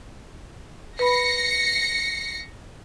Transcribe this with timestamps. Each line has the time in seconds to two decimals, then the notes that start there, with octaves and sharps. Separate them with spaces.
0.99 B4 B5 A#6 C7 C#7